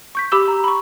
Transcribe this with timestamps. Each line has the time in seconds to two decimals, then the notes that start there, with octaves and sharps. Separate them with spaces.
0.15 C#6 G6 B6
0.32 G4 B5 D6 E6 E7 G7
0.48 A#5
0.64 B5 C#6